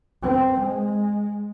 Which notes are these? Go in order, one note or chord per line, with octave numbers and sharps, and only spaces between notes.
C4
G#3